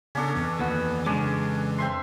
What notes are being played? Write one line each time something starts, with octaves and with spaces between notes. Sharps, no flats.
C#3 B3 C#4 D4 A4
F2 E3
D#2 B3 F#4
C#3 G#3 C#4 D4
C4 E5 C6